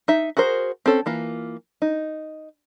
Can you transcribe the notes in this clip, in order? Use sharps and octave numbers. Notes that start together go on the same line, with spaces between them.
D#4 E5
F#4 G#4 A#4 C5
C4 C#4 A4
E3 A#3 F4
D#4